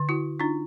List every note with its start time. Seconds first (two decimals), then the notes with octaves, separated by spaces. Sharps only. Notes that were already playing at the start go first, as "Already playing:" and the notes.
Already playing: D3
0.09 E4 F#4
0.40 D4 D#4 F4